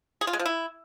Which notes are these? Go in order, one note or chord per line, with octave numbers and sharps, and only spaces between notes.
G#4
F4
G#3
F3
E4